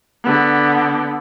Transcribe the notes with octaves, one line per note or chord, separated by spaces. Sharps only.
D3 B3